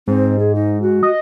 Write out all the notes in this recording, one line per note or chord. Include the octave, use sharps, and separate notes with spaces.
G#2 C4
G#4
D#4
F#4
D#5